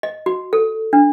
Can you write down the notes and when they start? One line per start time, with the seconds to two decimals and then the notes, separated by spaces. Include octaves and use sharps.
0.03 D#5
0.26 F#4
0.53 A4
0.93 D4